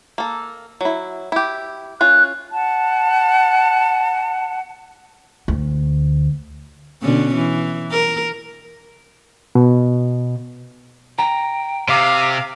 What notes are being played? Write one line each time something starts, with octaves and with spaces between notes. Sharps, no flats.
A#3 A4
F#3 E4
E4 G4
C#4 F4 F#6
F#5 A5
D2
B2 D3 C#4
E3
A#4
B2
G5 A#5
C3 F5 D6